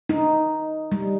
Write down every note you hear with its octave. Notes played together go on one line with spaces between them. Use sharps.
D#4
G3